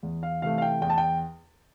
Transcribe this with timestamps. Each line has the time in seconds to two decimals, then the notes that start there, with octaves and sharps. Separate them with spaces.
0.03 E2
0.23 F5
0.42 C3 E3 A3 F5
0.58 F5
0.62 G5
0.81 E2 G5
0.90 A5
0.98 G5